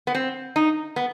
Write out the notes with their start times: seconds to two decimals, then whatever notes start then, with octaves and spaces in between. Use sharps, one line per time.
0.07 B3
0.15 C4
0.56 D#4
0.96 B3